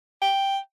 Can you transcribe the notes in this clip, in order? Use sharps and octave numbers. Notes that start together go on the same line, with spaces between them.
G5